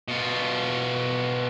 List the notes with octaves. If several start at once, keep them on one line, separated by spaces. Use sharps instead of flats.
B2 F4